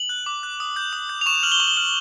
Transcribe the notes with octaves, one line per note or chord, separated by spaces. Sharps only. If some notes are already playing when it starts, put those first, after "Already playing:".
Already playing: F#7
F#6
D6
F#6
D#6
G6
D#6
G6
F7
C#6 E7
F7
F6 F#7
G7
C#6 F#7
G7
F6 F#7